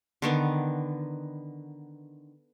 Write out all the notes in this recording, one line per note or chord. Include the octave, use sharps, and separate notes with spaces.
D3 D#3 B3